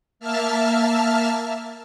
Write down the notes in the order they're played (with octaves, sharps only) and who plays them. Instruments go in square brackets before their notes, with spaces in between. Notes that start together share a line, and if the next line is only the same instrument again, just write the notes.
[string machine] A#3 E5 A5 F6